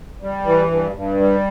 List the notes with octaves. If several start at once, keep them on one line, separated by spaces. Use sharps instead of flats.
G3
E3
G2
G2
G3